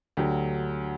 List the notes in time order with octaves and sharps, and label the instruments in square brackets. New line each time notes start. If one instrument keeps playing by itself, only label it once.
[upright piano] D2 D3 F#3 G4